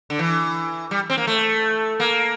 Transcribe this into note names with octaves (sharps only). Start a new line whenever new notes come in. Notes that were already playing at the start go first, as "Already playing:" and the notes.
D3
E3
G3
C4
A#3
A3
A#3